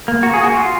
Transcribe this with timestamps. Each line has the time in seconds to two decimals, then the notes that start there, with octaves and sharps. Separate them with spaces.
0.08 A#3
0.23 F#4
0.34 G#4
0.43 F#4
0.53 F4